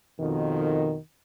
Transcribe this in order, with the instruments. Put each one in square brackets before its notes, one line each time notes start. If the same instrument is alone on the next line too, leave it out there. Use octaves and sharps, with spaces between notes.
[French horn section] F2 B2 D#3